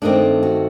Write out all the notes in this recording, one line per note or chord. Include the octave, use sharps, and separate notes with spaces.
G2 D#3 A3 C4 D4
F#4